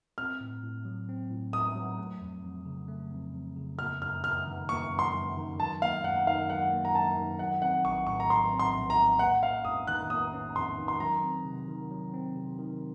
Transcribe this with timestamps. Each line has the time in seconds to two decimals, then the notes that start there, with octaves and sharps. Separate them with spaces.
0.18 C4 F6
0.41 A2
0.63 A2
0.85 F#3
1.09 C4
1.30 A2
1.53 A2 D#6
1.75 F#3
1.98 A3
2.21 F2
2.43 F2
2.65 C#3
2.88 A3
3.11 F2
3.34 F2
3.56 C#3
3.79 A#3 F6
4.01 F#2 F6
4.23 F#2 F6
4.46 D#3
4.69 A#3 C#6
4.91 F#2
4.99 C6
5.14 F#2
5.36 D#3
5.59 F#3 A5
5.82 A#3 F5
6.04 F#2 F#5
6.27 D#3 F5
6.50 F#3 F#5
6.73 A#3
6.85 A#5
6.94 F#2 A5
7.17 D#3
7.39 F#3 F#5
7.61 C4 F#5
7.84 A#1 C#6
8.07 A2 C#6
8.20 A#5
8.30 F#3 C6
8.52 C4
8.59 C6
8.75 A#1
8.90 A#5
8.97 A2
9.19 A#3 F#5
9.42 C#4 F5
9.64 F2 D#6
9.87 D#3 F#6
10.10 A#3 D#6
10.33 C#4
10.56 F2 C6
10.78 D#3
10.88 C6
11.00 F#3 A#5
11.23 C4
11.45 C3
11.68 D#3
11.91 F#3
12.14 C4
12.36 C3
12.58 D#3